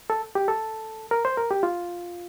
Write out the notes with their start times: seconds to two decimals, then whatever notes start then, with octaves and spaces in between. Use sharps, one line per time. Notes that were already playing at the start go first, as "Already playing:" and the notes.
0.10 A4
0.35 G4
0.48 A4
1.11 A#4
1.25 C5
1.37 A#4
1.51 G4
1.63 F4